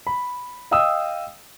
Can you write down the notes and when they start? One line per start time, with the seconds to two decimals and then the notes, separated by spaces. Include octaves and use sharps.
0.07 B5
0.71 D#5 F5 G5 D#6 E6